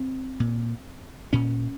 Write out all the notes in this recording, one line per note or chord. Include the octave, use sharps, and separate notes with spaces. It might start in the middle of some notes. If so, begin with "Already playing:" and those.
Already playing: C4
A#2
A#2 C#4